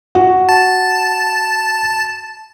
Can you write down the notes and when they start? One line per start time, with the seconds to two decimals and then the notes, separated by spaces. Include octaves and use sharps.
0.15 F#4
0.49 A5